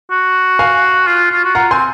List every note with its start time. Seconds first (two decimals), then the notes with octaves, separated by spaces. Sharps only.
0.11 F#4
0.59 F5 G#5
1.07 F4
1.31 F4
1.44 F#4
1.55 F4 F#5 A#5
1.71 C4 G#5 C6